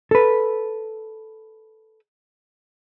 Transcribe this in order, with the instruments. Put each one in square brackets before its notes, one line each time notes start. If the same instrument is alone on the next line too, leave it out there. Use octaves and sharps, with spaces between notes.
[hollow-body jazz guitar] A4 B4